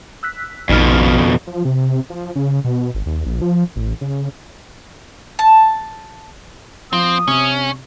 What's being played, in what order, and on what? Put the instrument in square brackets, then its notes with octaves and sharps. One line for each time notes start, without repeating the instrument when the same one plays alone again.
[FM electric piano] E6 F#6 B6
[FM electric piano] A#1 D#4 F6 [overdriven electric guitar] F2 B2
[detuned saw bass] F3
C3
F3
C#3
B2
G#1
D#2
A#1
F3
A1
C#3
[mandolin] A5
[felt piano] F3 [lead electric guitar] C4 [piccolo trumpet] D#6
[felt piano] C3 [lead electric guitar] C#4